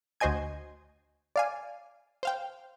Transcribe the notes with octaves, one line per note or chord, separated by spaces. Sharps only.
D2 F#4 C5 D#5 G#5 G#6
D5 F5 G#5
C5 F5 G5